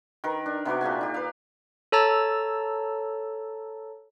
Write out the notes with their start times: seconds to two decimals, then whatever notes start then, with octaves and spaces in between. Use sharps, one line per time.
0.24 D#3 A#4 B4
0.46 D4
0.65 C3 B3 F#4 D6
0.81 A#2 G4 G#4 G#5
1.01 D#4 G4
1.14 B4 F5
1.92 A4 C#5 A5 A#5 E6 A6